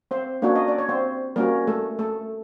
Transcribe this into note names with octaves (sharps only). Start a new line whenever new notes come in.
C4 C5
A#3 C#4 D4 F#4 C#5
D#5
D5
C#5
C4 C5
G3 A#3 C#4 F#4 A#4
A3 A4
A3 A4